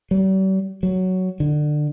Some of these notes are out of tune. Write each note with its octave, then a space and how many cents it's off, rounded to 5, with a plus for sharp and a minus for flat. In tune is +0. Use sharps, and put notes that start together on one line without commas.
G3 -45
F#3 +5
D3 +25